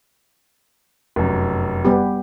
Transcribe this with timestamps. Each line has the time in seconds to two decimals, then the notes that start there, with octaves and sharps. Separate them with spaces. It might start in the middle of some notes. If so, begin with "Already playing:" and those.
1.16 F1 F#2
1.85 G3 B3 G4